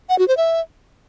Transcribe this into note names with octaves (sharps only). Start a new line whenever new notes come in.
F#5
F#4
C5
E5